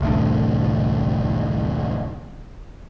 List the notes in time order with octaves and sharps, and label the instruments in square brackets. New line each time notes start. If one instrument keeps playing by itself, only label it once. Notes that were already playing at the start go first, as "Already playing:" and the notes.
[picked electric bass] E1 C2 A2 D3